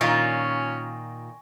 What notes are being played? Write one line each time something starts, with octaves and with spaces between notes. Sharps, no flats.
A#2 D#3 C#4 F4 G#5 C#6 A#6